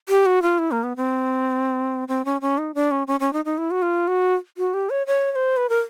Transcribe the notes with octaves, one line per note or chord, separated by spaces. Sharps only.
G4
F#4
F4
E4
A#3
B3
C4
C4
C#4
C#4
D#4
D4
C#4
C#4
C#4
D#4
D#4
E4
F#4
F4
F#4
F#4
G4
C#5
C#5
C#5
C5
B4
A#4